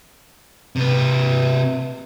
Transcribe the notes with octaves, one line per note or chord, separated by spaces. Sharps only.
C3 B4